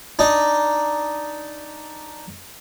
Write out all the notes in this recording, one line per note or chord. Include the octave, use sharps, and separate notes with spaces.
D4 D#4